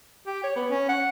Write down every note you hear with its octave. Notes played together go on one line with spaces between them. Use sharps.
G4
C#5
B3
C#4
F#5